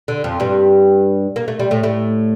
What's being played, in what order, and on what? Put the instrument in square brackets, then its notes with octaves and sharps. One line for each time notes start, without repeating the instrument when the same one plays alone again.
[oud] D3
F2 F3
G2 G3
A#3
A3
G3
A2 A3
A2 A3